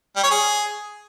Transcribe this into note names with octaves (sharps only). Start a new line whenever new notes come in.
G3
C#5
G#4